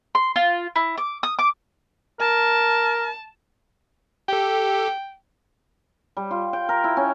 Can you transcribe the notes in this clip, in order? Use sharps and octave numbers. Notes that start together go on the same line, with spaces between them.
C6
F4
E4
D6
D#6
D6
A#4 A5
G4 A4 G5
G3
F4
G5
A#4
E4
C#4